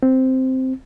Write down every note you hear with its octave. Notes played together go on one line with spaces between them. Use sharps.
C4